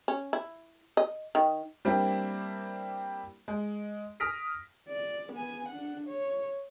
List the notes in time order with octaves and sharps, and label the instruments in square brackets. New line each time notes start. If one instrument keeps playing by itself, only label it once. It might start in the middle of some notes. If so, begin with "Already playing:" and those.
[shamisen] C#4
E4
D#5
D#3
[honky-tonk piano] G3 A#3 C4 D4 E4
G#3
D#6 F6 A#6 B6 D7
[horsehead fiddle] D5
B3 G#5
D4 F#5
C#5